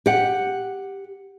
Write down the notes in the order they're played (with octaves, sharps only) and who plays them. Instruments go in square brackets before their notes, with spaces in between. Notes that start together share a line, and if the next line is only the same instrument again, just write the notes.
[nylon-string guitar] G4 F#5